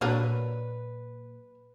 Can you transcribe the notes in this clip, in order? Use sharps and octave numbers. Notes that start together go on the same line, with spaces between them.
A#2 F#3 D4 A#4 B4